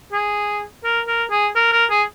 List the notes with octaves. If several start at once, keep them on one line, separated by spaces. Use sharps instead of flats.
G#4
A#4
A#4
G#4
A#4
A#4
G#4